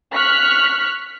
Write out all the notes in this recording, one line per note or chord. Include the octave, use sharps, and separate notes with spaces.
C#6 F6 F#6 B6